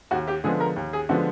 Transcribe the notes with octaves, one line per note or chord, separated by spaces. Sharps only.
D#2 F#4
G4
D3 F3 G#3 B3 G#4
A#4
D#2
G#4
D3 F3 G#3 B3 F#4